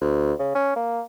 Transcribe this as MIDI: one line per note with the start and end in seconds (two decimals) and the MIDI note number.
0.01 0.33 38
0.39 0.52 49
0.55 0.75 61
0.76 1.02 58